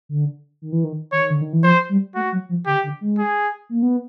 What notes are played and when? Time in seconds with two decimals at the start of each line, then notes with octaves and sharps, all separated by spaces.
0.09 D3
0.62 D#3
0.72 E3
0.84 D#3
1.12 D#3 C#5
1.30 D3
1.41 D#3
1.53 E3
1.63 F3 C5
1.89 G3
2.15 A3 F#4
2.32 F#3
2.49 F3
2.66 D3 G4
2.84 D3
3.01 G#3
3.18 G#4
3.69 A#3
3.83 B3